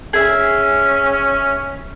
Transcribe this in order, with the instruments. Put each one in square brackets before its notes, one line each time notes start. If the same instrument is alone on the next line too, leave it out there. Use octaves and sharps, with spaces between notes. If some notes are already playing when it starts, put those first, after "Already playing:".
[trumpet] C#4 [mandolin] G#4 E5